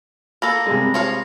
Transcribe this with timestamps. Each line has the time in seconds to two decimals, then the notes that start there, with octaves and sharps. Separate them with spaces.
0.42 A#3 A4 B5 A#6
0.66 C3 G3 G#3
0.94 F3 C#5 F5